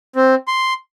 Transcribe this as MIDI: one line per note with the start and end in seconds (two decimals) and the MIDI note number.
0.16 0.35 60
0.48 0.73 84